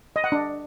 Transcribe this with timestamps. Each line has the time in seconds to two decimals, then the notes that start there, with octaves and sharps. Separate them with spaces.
0.16 D#5
0.24 F#5
0.32 D4